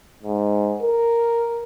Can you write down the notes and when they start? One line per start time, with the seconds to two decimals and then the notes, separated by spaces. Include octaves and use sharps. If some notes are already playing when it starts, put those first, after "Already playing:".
0.23 G#2
0.82 A#4